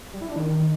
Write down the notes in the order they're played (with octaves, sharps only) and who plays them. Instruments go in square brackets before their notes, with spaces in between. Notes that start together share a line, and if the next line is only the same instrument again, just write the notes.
[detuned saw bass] G3
E4
D4
D#3